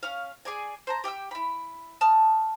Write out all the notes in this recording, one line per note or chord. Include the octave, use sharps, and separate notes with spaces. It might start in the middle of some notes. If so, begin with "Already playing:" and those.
C#4 F5
G#4 D5 G#5
C5 A5 A#5
G4 G5 D#6 E6
E4 B5
A5 D#6 F6